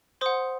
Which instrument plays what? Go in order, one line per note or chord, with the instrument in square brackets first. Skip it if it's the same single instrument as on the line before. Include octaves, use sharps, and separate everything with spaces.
[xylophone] C5 F#5 C6 D#6